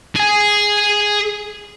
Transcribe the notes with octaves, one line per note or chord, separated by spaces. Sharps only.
G#4 G#5